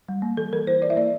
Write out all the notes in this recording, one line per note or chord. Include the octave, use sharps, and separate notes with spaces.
G3
A#3
E3 A4
E3 A#4
E4 C5
E4 D5
E5
A#3 D5